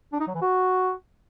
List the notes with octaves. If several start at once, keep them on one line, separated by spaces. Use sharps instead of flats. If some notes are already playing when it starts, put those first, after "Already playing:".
D4
D#4
F#3
E3
F#4